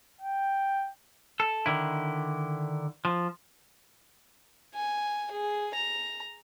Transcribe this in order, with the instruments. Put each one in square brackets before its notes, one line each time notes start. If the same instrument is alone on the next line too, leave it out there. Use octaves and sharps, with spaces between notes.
[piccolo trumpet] G5
[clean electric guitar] A4
D3 D#3 E4
F3
[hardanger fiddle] G#5
G#4
A#5